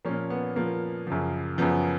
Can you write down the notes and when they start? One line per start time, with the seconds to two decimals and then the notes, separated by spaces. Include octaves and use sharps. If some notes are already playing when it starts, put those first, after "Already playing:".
0.05 A#2 F3 A#3 C#4
0.30 B3
0.56 A#2 F3 A#3
1.07 F#2 C#3 F3
1.58 F#2 C#3 F3 B3